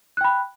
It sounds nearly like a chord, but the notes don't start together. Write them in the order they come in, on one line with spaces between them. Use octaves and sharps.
F#6 G5 B5